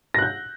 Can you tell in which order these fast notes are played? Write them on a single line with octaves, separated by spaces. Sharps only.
A#6 F#6 G6